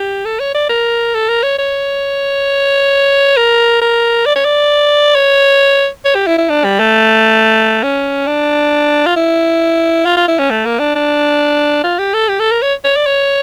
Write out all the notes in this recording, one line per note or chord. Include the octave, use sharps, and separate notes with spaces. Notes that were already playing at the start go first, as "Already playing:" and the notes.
Already playing: G4
A4
C#5
D5
A#4
A4
A#4
C#5
C#5
A#4
A#4
D5
C#5
D5
C#5
C#5
G4
E4
E4
D4
G3
A3
C#4
D4
F4
E4
F4
F4
E4
C#4
A3
A#3
D4
D4
F4
G4
A4
G4
A4
A#4
C#5
C#5
D5
C#5